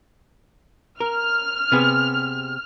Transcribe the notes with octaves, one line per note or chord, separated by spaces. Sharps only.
A#4 F6
C3 B3 G#4